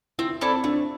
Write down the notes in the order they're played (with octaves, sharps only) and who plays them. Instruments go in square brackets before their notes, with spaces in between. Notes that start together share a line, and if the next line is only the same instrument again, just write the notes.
[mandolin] C4 [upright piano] E4
[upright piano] C4 [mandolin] E4 A4 D5
[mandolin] A3 [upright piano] D4